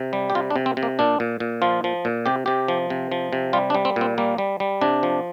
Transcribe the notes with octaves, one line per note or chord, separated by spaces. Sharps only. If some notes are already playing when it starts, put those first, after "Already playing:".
Already playing: C3
G3
G4
C3 F4
D4
C3
C4
C3
A#3
A#2 D4
A#2
A#2
F3 F4
F3
A#2
C3 G4
C3 G4
F3
C3
F3
C3
G3 F4
D4
G3
C4
A#2 C4
G3 A#3
G3
G3
C3 D4
F3